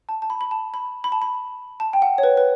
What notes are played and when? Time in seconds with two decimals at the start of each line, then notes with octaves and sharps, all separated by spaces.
0.09 A5
0.22 A5
0.30 B5
0.41 B5
0.51 A5
0.74 B5
1.04 B5
1.12 A5
1.22 B5
1.80 A5
1.93 G5
2.02 F#5
2.18 C#5
2.23 B4
2.37 B4